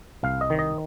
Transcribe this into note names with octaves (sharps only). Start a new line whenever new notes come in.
C2 F5
D#5
D#3
D#5